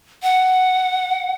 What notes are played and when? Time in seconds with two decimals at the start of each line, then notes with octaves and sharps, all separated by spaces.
0.23 F#5